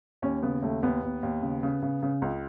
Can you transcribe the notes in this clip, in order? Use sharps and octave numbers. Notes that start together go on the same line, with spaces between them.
D#2 C#4
C#3 B3
D#2 A3
D#2 B3
D#2
D#2
C#3
C#3
C#3
C#3
C#2